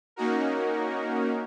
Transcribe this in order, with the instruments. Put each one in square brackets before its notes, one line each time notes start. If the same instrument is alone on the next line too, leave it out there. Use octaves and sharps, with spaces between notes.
[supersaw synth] A#3 C#4 D#4 F#4 A#4